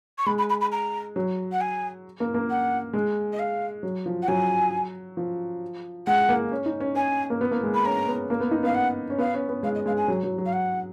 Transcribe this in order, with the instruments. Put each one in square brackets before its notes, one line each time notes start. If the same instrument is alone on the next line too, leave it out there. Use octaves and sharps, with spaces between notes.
[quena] C#6
[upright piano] G#3 [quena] B5
[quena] B5
B5
B5
A#5
[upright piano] F#3
[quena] F#5
G#5
[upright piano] A#3
A#3
[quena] F#5
[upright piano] G#3
[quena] D#5
F5
[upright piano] F#3
F3
[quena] F#5
[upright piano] F#3 [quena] G#5
[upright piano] F3
[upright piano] G#3 [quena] F#5
[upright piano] A#3
C#4
D#4
C#4
[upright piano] C#4 [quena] G#5
[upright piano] A#3
B3
A#3
G#3
[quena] B5
[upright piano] C#4 [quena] A#5
[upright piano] B3
A#3
B3
D#4
[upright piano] B3 [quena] F5
[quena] F#5
[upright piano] C#4
[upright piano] B3 [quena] F5
[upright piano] C#4
B3
[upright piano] G#3 [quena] F5
[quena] D#5
[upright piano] G#3 [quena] F5
[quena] G#5
[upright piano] F#3
F#3
F#3
[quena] F5
F#5